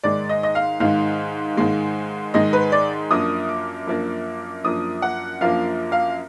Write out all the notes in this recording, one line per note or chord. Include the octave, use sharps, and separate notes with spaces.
G#2 D#3 G#3 D5
D#5
D#5
F5
G#2 D#3 G#3 F5
G#2 D#3 G#3
G#2 D#3 G#3 D#5
B4
D5
F#2 F3 A#3 D4 D#6
D6
F#2 F3 A#3 D4
F#2 F3 A#3 D4 D#6
F#5
F#2 F3 A#3 D4 F5
F5